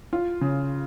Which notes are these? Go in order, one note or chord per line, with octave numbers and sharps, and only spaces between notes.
F4
C#3